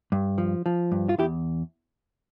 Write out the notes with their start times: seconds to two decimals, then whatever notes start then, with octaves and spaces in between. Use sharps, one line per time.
0.12 G2
0.38 F3
0.66 F3
0.92 G2
1.09 F4
1.18 E2 E4 G4